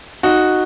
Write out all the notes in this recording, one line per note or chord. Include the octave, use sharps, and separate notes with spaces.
D#4 F#4